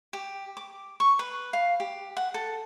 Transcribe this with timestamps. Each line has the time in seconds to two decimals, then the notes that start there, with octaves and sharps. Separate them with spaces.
0.13 G4
0.57 D6
1.00 C#6
1.19 B4
1.53 F5
1.80 G4
2.17 F#5
2.34 A4